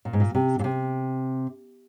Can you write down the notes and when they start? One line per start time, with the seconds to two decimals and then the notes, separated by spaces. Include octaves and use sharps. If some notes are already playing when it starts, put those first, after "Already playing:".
0.05 A#2
0.13 G#2
0.20 A#2
0.35 C3
0.59 A#2
0.64 C3